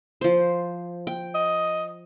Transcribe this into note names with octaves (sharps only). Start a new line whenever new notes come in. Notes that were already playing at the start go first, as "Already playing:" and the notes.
F3 C5
G5
D#5